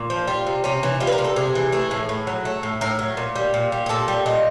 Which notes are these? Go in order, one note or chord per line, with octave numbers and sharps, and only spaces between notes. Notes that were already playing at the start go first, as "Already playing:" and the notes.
Already playing: A#2
F3
G3 F4
C3
C3 C#4
E3
G3 F4
B4
A#4
C3
A4
C3 G#4
E3
A3 G#4
A2
A2
F#3
A3
A2
A2 A#4
F#3
A#2
G3
A#2
G3
G#4
A#2 A4
G3
A#2 D#5